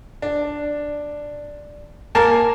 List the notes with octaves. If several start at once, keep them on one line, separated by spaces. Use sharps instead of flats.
D4
A#3 A#4 G#5 A5